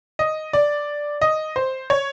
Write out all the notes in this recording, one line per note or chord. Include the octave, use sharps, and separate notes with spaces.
D#5
D5
D#5
C5
C#5